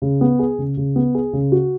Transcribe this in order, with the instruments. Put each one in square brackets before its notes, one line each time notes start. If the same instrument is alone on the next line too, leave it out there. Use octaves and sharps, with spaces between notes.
[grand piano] C#3
B3
G#4
C#3
C#3
B3
G#4
C#3
F#4